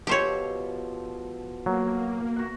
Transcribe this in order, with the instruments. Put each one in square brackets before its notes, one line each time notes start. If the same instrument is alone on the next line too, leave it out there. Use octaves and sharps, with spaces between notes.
[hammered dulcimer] B2 F3 A4 [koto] G4 C5 C#5
[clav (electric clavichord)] F#3 [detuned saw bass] A#3
[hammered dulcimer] F#4 F#5